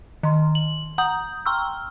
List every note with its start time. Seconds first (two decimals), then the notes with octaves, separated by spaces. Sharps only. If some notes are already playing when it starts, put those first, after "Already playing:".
0.23 D#3 C6
0.55 F#7
0.98 F#5 A#5 D#6 G6
1.46 G5 A#5 C6 C#6 E6 F6